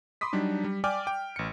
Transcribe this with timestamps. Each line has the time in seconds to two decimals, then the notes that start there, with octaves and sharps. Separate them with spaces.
0.21 B5 C6 D6 D#6 B6
0.33 F#3 G3 D4 D#4
0.64 G3
0.84 D5 G5 G#5 D6 F6
1.07 G5
1.36 A1 C#7